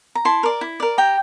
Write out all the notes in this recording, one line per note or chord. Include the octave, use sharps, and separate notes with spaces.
A#5
E4 A5 C6
A#4 D5
E4
A#4 D5
G4 G5 A#5